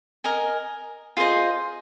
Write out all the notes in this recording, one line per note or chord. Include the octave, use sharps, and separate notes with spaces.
A#4 D#5 G#5
F4 G#4 C5 D#5